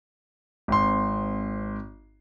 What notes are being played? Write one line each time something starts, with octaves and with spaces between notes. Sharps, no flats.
G#1 C4 C6